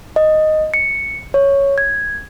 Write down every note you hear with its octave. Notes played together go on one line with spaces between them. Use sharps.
D#5
C#7
C#5
G#6